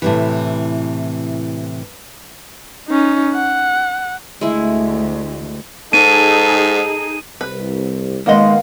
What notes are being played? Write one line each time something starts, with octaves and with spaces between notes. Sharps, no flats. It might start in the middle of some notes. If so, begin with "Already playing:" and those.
A2 C3 E3
C#4 D#4
F#5
D2 G#3 E4
G#2 D#4 G#4 A4 D#7
C2 B4
D#3 G#3 A#3 B3 D#5 F5 F#5